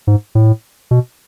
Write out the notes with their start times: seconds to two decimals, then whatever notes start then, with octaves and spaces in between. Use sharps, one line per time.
0.07 G#2
0.35 A2
0.91 B2